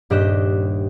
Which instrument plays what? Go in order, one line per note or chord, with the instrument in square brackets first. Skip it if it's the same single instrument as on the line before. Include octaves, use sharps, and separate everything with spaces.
[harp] D#1 G2 G4 D#5 F#6 E7